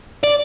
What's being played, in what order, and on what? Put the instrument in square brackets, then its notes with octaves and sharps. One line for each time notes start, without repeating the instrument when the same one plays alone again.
[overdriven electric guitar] D5